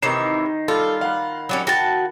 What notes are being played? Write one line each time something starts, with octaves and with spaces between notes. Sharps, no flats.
C3 D#3 E3 D#4 C#5 C7 E7
G3 F4 A4
F5 F#5 B5
F#3 G3 C#4
F#4 G5 A5